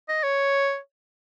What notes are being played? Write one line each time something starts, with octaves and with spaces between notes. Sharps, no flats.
D#5
C#5